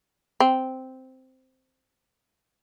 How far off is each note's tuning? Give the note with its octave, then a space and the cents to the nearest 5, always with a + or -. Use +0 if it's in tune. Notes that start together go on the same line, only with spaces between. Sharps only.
C4 -5